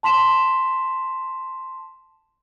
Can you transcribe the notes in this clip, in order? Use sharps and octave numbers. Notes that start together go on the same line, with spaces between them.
A5 C6 B6 E7